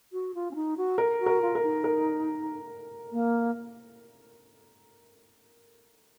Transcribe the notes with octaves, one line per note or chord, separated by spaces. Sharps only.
F#4
F4
C#4
D#4
F#4
A#4
F#4
A#4
F4
A#4
D#4
A#4
A#3